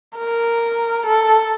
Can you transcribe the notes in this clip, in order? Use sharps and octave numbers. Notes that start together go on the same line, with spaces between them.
A#4
A4